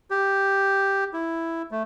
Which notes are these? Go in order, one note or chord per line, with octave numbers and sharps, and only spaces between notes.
G4
E4
A3